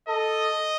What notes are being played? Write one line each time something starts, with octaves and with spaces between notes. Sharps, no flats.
A4 D#5